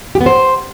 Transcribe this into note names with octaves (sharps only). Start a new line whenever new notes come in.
G4
B3
C5